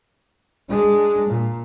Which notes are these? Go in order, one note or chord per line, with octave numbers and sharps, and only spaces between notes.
G#3 D4
A#2